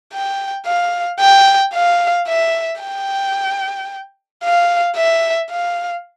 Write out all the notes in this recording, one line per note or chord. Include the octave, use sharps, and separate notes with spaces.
G5
F5
G5
F5
E5
G5
F5
E5
F5